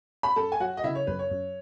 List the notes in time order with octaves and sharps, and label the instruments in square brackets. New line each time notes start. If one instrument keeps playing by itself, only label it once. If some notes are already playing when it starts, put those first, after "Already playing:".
[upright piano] B5
[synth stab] F#2 [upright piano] A4 A5
[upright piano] G#5
[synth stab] F#3 [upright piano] F#4 F#5
[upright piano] D#5
[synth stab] C#3 [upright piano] E4 E5
[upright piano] C#5
[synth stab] F#2 [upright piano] B4
[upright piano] C#5
[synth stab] F#2